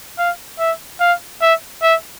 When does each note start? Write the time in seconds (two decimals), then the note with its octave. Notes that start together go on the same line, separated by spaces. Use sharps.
0.18 F5
0.59 E5
1.00 F5
1.41 E5
1.82 E5